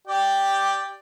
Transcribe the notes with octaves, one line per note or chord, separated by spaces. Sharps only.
G4 D5 G5